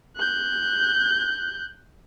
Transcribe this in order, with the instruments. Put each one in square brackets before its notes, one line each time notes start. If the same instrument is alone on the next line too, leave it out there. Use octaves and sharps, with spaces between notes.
[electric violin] F#6 G6